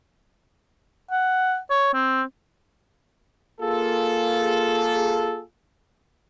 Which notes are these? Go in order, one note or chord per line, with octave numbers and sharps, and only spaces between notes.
F#5
C#5
C4
A#3 F4 G#4 A4